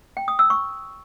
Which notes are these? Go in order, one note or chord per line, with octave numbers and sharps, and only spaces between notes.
G5
D#6
E6
C#6